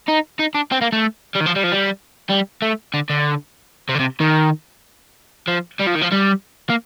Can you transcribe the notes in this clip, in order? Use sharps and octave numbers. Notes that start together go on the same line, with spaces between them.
D#4
D#4
D4
C4
A#3
A3
G3
D#3
F3
G3
F3
G3
G3
A3
D3
D3
C3
D3
C3
D#3
F3
G3
F3
D#3
F3
G3
A#3